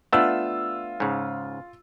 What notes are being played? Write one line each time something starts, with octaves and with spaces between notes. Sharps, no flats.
A3 B3 D4 F4 E6
G#2 C#3